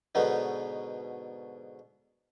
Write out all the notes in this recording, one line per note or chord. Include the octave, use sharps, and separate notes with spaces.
G#2 B2 D3 B3 D#4